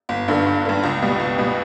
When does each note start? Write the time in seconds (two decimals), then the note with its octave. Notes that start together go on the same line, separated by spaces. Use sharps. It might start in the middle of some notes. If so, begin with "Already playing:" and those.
0.09 G1
0.28 G2 D3
0.46 G1
0.65 G2 D3
0.83 C#2
1.02 B2 G3
1.20 C#2
1.38 B2 G3